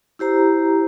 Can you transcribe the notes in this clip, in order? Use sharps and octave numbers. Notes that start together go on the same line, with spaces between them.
E4 G4 C5 A#5